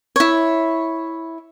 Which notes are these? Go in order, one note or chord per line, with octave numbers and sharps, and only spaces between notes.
E4 C#5